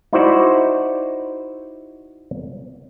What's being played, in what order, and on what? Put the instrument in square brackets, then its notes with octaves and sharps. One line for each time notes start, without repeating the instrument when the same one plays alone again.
[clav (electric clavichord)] D#4 E4 F#4 C5 D5 E5